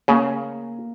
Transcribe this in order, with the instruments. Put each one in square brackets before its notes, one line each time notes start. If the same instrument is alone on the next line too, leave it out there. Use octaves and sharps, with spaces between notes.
[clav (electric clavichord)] C#3 [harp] A#3